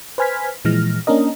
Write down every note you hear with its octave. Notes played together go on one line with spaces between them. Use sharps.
B4 C5 G#5 F6 G#6 B6
A#2 E3 F3 G#3 F6 A#6
A#3 C#4 D4 A#4 D#5